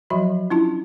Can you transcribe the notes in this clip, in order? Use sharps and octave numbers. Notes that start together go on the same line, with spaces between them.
F3 F#3 F#4 D#5 E5 B5
C#4 D4 E4 F4 A5